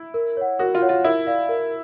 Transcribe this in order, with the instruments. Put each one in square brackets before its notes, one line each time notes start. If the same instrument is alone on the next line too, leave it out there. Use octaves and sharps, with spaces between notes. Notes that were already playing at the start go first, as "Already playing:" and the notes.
Already playing: [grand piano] E4
[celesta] A#4
C#5 F#5
[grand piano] F#4 [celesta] A#4
[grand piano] F4
[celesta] C#5 F#5
[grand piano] F4
[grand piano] E4 [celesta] A#4
[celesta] D5 F5
A#4